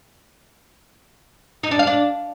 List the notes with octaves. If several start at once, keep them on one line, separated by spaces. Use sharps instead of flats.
D#4
D4
F5
D4